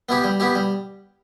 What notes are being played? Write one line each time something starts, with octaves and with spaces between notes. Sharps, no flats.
B3 E4 G4
G3
B3 E4 G4
G3